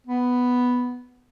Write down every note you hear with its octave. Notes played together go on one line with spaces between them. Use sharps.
B3